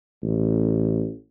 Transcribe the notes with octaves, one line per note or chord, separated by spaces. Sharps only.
A1